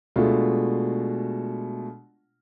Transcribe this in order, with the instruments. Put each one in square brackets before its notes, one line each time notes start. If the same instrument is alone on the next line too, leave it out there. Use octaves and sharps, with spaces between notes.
[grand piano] B2 G#3 A3 D4 F4